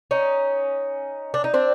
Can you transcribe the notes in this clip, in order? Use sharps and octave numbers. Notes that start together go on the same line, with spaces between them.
C#4 D#4
D4
D#4
C4 D4